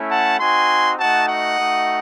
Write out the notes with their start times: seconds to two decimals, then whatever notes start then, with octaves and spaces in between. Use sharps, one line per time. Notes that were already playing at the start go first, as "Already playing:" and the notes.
Already playing: A3 C#4 E4
0.09 F#5 A5
0.39 C4 D#4 F#4 G#5 C6
0.98 A3 D#4 F#4 F#5 A5
1.28 D#5 F#5
1.57 A3 D#4 F#4